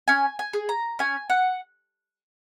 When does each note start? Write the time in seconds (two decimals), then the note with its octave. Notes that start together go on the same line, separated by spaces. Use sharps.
0.08 C#4 G#5
0.39 G#5
0.53 G#4
0.69 A#5
0.99 C#4 G#5
1.30 F#5